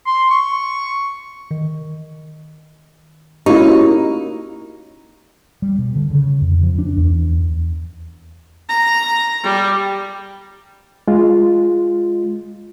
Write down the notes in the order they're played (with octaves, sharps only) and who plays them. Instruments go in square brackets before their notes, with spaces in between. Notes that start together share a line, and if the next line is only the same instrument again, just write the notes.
[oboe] C6
C#6
[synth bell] D#3
[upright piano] A#3 C#4 C#6 [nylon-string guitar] D#4 [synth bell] E4 F#4 G4
[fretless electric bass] G3
B2
D3
C#3
F2
F3
D4
E2
[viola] A#5
G3
[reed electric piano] G#3 F4